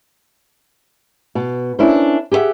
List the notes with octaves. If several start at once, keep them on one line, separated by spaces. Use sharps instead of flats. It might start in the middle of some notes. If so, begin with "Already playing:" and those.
B2
C#4 D4 E4 A#4 C5
G4 G#4 B4 E5 F#5